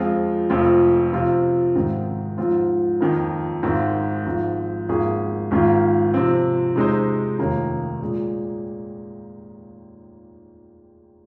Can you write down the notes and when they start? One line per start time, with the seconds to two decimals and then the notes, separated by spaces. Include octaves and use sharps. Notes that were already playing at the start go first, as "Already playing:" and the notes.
Already playing: F2 F3 G#3 C4 F4
0.50 F1 F2 F3 C4 F4
1.13 C3 F3 C4 F4
1.76 G#1 G#2 D#3 C4
2.38 G#2 F3 C4 F4
3.01 F2 D#3 A#3
3.63 G#1 G#2 D#3 C4
4.26 G#1 G#2 F3
4.88 G#1 G#2 F3 A#3 G#4
5.51 G#1 G#2 D#3 A#3 F4
6.14 C3 F3 C4
6.76 C3 G#3 D#4 C5
7.38 F1 D#2 D#3 A#3 D#4
8.02 A#2 G#3